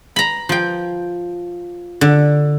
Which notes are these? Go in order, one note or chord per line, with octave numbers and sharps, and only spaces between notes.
A#5 B5
F3 G5
D3